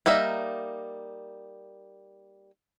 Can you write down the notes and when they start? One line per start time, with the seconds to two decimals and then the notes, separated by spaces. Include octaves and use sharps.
0.06 G3 A#3 D#4 E5